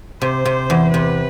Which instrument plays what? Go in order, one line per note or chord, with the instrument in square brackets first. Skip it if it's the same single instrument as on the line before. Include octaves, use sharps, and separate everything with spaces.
[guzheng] C3 [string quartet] C5
[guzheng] C3
E2
[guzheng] C3 [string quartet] B4